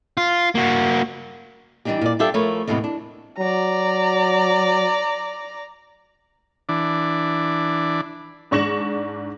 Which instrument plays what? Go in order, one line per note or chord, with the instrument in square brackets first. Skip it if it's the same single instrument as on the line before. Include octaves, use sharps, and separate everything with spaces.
[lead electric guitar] F4
A#3 F#4
[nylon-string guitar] E3 G3 A#3 D4 D#4 G4
A#2 D5
G3 D4 F4 G4 A4 E5
F3 A3 A#4 B4 C#5
E2 A2 C3 E3 G#3 B3
D4
[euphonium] F#3 [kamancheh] D5 A#5
[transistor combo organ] E3 D4
[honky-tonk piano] G#2 D4 C#6 A#6 E7 F#7